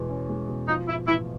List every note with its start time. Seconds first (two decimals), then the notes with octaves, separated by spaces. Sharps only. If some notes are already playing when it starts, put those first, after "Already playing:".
Already playing: E2 B2 G#3
0.10 C#4
0.29 G#3
0.49 B2
0.68 F3 D#4
0.88 G#2 E4
1.07 A1 E4